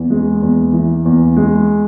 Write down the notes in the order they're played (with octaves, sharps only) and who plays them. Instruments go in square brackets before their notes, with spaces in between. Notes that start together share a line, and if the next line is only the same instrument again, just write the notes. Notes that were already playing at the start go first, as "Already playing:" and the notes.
Already playing: [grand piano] E2
G#3
E2
E3
E2
G#3